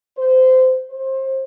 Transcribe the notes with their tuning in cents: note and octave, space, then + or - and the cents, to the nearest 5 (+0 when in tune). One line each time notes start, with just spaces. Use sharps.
C5 -20
C5 +25